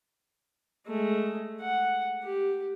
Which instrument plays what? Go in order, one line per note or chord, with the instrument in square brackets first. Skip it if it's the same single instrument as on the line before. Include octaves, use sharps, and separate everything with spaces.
[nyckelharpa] G#3 A3
F#5
G4